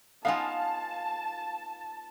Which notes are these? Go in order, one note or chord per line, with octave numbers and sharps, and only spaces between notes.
B3 D#4 F4 F5 G#5 A5